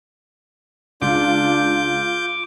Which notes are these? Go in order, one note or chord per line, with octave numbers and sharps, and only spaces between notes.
C#2 D4 F4 D6 G6